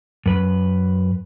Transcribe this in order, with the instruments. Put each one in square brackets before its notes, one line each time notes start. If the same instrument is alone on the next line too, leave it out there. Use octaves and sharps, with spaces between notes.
[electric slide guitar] F#2 B4